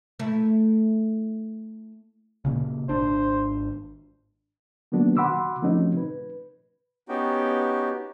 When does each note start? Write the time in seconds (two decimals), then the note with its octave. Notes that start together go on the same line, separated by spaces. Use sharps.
0.19 A3 E4
2.45 A#2 C#3
2.89 G#1 D4 C5
4.92 D#3 F#3 A#3 B3 D4 F#4
5.17 F#4 F#5 B5 C6 D6 E6
5.62 F3 A3 C4 C#4 D#4 F#4
5.97 B4
7.09 B3 C#4 D#4 F#4 G4 G5